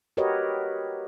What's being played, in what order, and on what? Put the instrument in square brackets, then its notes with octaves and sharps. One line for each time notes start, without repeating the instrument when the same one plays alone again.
[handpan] F#4 G4 A#4 B4 C#5 D#5